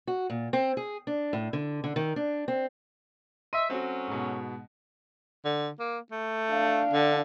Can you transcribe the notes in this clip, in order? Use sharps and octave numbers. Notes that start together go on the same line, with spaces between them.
F#4
A#2
C4
G#4
D4
A2
D3
D3
D#3
D4
C4
D#5 E5 C6 D#7
F#3 A3 C4 C#4 F#4
G#2 B2
D3
A#3
A3
D4 F5
D3